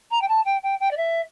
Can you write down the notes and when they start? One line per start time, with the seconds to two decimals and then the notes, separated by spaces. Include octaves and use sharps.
0.11 A#5
0.21 G5
0.28 A5
0.45 G5
0.63 G5
0.80 G5
0.91 D5
0.97 E5